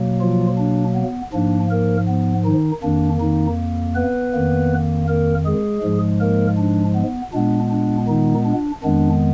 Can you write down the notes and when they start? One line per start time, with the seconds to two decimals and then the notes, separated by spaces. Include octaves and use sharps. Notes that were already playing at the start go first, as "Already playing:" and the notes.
Already playing: B2 F#3 A#3
0.21 F3 F4
0.58 D4
0.96 B3
1.33 G#2 F3 A#3 D4
1.71 A#3 A#4
2.08 B3
2.45 D#3 D#4
2.83 F2 D#3 A#3 D4
3.20 D#3 D#4
3.95 B3 B4
4.33 F2 D#3 A#3
5.08 A#3 A#4
5.45 G#3 G#4
5.83 G#2 F3 G#3
6.21 A#3 A#4
6.58 D4
6.96 B3
7.33 A#2 G#3 B3 D4
7.71 D4
8.08 D#3 D#4
8.46 D4
8.83 F2 D#3 G#3 B3 D4